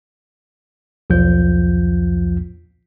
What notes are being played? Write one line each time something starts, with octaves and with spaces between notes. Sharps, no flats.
B1 E2 F3 F4 G6